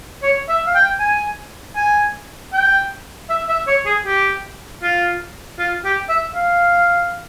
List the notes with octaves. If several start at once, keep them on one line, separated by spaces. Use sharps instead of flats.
C#5
E5
F5
G5
G#5
G#5
G5
E5
E5
C#5
G#4
G4
F4
F4
G4
E5
F5